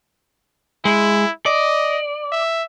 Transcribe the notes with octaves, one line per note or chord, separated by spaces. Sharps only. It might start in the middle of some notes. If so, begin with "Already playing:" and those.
G#3 E4
D5 D#5
E5